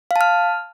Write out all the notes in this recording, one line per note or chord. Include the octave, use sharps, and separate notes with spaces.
F5
A5
F6